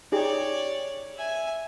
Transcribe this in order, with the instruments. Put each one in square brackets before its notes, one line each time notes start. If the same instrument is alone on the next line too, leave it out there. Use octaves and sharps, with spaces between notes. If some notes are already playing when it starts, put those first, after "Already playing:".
[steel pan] D#4 G4 G#4 [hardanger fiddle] C#5 D5
[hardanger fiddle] E5 G#5